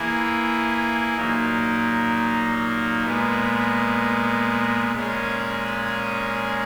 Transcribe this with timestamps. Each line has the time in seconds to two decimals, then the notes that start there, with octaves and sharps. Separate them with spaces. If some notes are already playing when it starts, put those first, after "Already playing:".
Already playing: E3 A#3 E4 G#4
1.17 A#2 F#3 A#3 D#4
3.06 A#2 G#3 B3
4.95 A#2 G#3 C#4 G#4